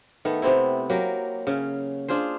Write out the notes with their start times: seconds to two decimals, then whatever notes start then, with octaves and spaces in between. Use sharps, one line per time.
0.25 D#3 A3 B3
0.42 C3 B3 C4 E4
0.90 F#3 A#3 G4
1.47 C#3 C#4
2.08 D4 F4 G#4 C5